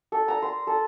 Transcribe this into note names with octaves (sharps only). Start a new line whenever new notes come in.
A4
A#5
C6
A4